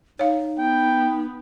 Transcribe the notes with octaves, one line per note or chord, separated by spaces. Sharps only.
D#4 C#5 F5
B3 G5